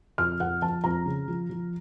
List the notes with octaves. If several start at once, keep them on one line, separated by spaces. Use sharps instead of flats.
F2 F6
F2 F#5
F3 A5
F2 A#5
C#3
F3
F3